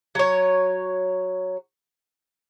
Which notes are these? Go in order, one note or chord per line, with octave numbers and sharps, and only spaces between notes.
F#3 C#5